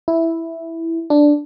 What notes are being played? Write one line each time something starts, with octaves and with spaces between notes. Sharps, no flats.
E4
D4